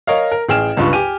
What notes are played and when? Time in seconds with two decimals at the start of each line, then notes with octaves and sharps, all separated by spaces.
0.07 A#4 C#5 D#5 F5
0.32 A#4
0.48 A1 G#4 G5 F6 E7
0.77 C#2 G2 F4 B4 C#6
0.93 G4 G#5 D#7